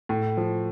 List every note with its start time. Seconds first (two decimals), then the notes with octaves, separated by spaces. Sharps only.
0.09 A2
0.37 F3